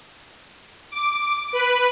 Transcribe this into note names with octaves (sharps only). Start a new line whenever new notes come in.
D6
B4